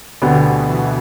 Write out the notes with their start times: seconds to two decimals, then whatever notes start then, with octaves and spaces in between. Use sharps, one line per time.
0.21 D2 B2 D3 B3 G4
0.68 E3